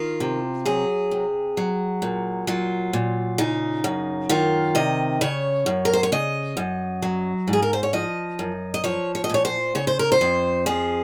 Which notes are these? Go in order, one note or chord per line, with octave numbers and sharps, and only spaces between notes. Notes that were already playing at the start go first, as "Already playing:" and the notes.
Already playing: D#3 F4
C3
F#3 G#4
C3
F#3
A#2
F#3 F4
A#2
C#3 D#4
F#2
D#3 F4
C3 D#5
C#3 C#5
F#2
A#4
C5
C#5
C#3 D#5
F#2
F#3
G#2
G#4
A#4
C5
C#5
F3 D#5
F#2
D#5
F3 C#5
C#5
D#5
A#2 C#5
C5
C#3 C#5
C5
A#4
C5
F2
F3 G#4